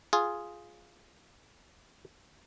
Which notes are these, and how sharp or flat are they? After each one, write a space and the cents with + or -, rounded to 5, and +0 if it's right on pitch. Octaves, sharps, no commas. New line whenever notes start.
F4 +0 G#4 +0